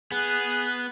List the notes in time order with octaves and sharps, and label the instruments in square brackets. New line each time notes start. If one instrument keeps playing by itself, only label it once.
[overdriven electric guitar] B3 [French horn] G#4 [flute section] F#6